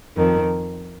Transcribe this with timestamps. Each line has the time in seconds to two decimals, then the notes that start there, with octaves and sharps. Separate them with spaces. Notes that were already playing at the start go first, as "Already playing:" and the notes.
0.16 F2 D#3